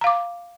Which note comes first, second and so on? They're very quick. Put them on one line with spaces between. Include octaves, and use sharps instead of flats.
A#5 F5 D6